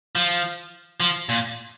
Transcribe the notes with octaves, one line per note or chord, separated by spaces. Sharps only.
F3
F3
A#2